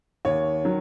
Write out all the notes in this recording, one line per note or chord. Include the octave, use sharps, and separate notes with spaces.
D#2 C#5
D#3 F#3